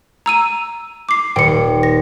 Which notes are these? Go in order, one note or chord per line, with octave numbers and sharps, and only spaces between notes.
A#5 E6 D#7
D6 C7
D#1 G5 C#7
A#6